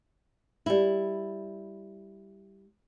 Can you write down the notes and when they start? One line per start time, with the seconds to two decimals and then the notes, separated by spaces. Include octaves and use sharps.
0.66 G3 E4